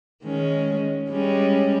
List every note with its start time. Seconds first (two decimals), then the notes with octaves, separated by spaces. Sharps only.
0.23 D#3 G#3 C#4
1.09 G3 G#3 C#4